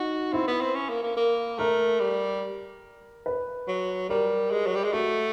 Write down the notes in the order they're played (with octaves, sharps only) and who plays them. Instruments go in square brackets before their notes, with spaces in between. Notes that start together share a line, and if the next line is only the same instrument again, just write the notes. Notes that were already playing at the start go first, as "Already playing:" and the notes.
Already playing: [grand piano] D#4 [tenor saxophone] F#4
[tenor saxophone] C4 [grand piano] E4
[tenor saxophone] B3
C4
C#4
A#3
A#3
A#3
[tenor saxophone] A3 [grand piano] A#4
[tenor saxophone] G3
[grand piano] B4
[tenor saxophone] F#3
[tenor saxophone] G3 [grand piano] A#4
[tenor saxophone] G#3
F#3
G3
G#3
[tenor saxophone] A3 [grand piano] F#4